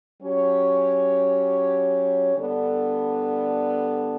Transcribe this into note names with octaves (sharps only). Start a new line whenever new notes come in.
F#3 C#4 G4 C#5
D3 G3 B3 D4 A4